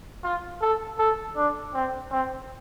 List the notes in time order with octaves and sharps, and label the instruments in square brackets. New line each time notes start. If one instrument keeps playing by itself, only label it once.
[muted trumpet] F4
A4
A4
D4
C4
C4